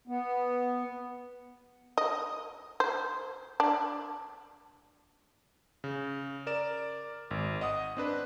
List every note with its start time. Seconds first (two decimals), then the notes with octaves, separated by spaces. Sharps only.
0.08 B3
1.98 D#5
2.80 C5
3.60 D4
5.84 C#3
6.47 A#4 D5 E7
7.31 G#1
7.61 D#5 F#5 D#6
7.97 C4 D4 B4